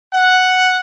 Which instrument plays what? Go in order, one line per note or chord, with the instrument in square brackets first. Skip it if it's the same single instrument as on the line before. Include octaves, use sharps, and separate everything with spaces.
[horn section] F#5